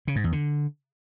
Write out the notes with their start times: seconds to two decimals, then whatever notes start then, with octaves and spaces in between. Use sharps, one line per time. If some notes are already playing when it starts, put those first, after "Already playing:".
0.07 C#3
0.16 G#2
0.24 E2
0.32 D3